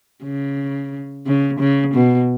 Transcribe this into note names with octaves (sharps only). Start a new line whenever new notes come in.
C#3
C#3
C#3
B2